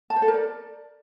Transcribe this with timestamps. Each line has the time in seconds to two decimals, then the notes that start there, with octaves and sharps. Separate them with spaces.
0.10 A5
0.16 C5
0.22 A4
0.28 A#4
0.34 D5